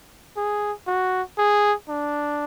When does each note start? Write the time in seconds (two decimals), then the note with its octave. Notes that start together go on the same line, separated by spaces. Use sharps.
0.37 G#4
0.87 F#4
1.38 G#4
1.89 D4